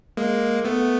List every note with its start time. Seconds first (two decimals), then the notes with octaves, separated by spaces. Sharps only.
0.17 G#3 A#3
0.65 A3 B3